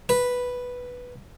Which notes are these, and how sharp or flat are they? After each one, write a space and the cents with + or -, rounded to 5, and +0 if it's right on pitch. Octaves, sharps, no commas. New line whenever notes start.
B4 +0